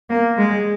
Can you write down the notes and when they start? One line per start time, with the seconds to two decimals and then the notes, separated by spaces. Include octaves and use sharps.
0.09 A#3
0.38 G#3